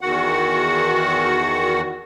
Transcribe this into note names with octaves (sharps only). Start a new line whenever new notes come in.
E2 D#3 F#4 F#5